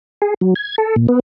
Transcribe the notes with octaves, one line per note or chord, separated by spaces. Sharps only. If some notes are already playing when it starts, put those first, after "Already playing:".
G#4
F#3
G#6
A4
A#2
B3